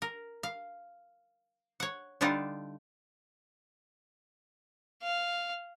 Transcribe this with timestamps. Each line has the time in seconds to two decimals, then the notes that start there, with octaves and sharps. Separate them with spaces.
0.02 A#4
0.43 F5
1.80 C#5 F#5
2.21 D3 G3 D4 D#4 F4 F#5
5.02 F5